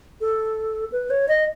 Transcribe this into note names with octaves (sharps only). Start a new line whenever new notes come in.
A4
B4
C#5
D#5